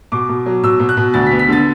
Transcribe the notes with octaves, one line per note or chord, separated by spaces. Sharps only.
B2 D6
B2
F#3
B2 E6
B2
F#6
B2
D2 A6
B6
B3
B6
D3 A6